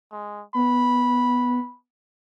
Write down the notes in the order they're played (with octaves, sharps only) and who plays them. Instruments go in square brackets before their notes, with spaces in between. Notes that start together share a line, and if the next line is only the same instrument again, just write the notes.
[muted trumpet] G#3
[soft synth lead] B3 [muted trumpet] B5